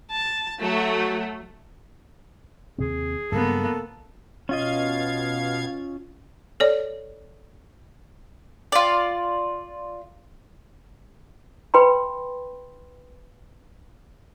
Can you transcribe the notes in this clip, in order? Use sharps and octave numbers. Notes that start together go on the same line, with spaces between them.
A5
F#3 A3 F#4
D#2 C3 C4 G#4
G2 C#3 F#3 A#3 B3 A4
B2 C#4 F4 D#5 F5 G#6
A4 C#5 D5
F4 D5
B4 G5 B5 C6